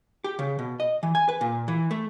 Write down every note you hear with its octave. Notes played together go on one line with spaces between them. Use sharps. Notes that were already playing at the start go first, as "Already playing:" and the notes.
G4
C#3
B2
D#5
E3
G#5
B4
A#2
E3
A3